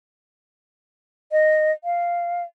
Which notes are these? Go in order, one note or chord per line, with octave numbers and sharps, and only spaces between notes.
D#5
F5